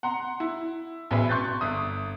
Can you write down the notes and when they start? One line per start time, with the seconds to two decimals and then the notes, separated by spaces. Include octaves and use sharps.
0.03 F#5 A#5 C6
0.40 E4
1.11 A1 B2 G#4 B4 E5
1.29 C6 C#6 F#6 G6 A6
1.61 G1 E5 D#6